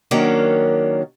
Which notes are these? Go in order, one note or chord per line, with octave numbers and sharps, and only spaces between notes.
D#3 F#3 A#3 C#4 D4